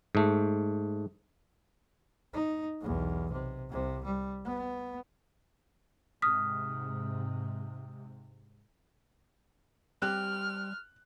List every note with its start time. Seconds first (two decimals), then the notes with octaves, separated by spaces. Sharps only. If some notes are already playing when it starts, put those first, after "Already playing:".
0.15 G#2 A3
2.33 D#4
2.81 B1 E2
3.31 C3
3.69 C2 C3
4.04 G3
4.45 B3
6.22 G#2 C3 D#6 F6 B6
10.02 G3 C4 G4 F6 F#6